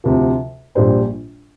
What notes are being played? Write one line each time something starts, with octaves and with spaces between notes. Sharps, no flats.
D2 C3 F3
A#1 A#2 G3 D4 C5